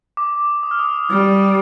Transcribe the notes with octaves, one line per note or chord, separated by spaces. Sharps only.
D6
D#6
F6
D#6
G3 F6